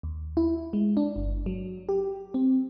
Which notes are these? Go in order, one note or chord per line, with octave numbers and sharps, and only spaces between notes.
D#2
E4
G#3
D4
G1
F#3
G4
C4